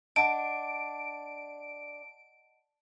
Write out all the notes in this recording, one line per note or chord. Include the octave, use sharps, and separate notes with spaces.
D4 D#5 F#5 A5 D7